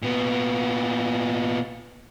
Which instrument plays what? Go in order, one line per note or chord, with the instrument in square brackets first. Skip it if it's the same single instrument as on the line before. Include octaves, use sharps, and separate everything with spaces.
[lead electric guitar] A#2 B3